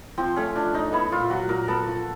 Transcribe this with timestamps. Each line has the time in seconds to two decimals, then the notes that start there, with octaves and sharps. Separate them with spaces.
0.18 F3 C4
0.36 A3 C#4
0.55 F3 D4
0.74 C#4 D#4
0.92 B3 E4
1.12 A#2 F4
1.30 F#3 F#4
1.49 A#2 A#4
1.68 B3 A4
1.87 F3